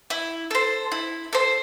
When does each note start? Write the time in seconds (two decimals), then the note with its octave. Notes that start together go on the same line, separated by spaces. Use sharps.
0.10 E4
0.51 A4 C5
0.92 E4
1.33 A4 C5